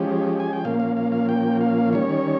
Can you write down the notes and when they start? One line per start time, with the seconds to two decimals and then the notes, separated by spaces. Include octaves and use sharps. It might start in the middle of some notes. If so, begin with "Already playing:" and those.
Already playing: F3 G#3 C#4 G4
0.40 G#5
0.53 G5
0.65 A#2 F3 A#3 C#4 F5
0.80 F5
0.97 F5
1.12 F5
1.29 G5
1.61 F5
1.93 D#3 G3 C#4 C#5